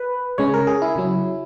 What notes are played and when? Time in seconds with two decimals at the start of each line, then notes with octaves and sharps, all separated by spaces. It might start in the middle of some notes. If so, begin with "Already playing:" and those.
Already playing: B4
0.38 C#3 G#3 C#4 C#5
0.54 A#4
0.67 G#4
0.82 E4
0.96 C#3 F#3 C#4